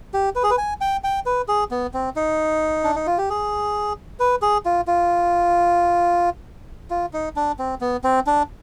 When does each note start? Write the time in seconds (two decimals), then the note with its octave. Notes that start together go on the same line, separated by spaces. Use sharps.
0.14 G4
0.35 B4
0.43 G#4
0.50 B4
0.58 G#5
0.81 G5
1.04 G5
1.26 B4
1.48 G#4
1.71 B3
1.94 C4
2.16 D#4
2.84 D4
2.95 D#4
3.07 F4
3.18 G4
3.30 G#4
4.20 B4
4.42 G#4
4.65 F4
4.87 F4
6.90 F4
7.13 D#4
7.36 D4
7.59 C4
7.81 B3
8.04 C4
8.27 D4